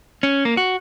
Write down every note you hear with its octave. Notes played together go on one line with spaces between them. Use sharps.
C#4
A#3
F#4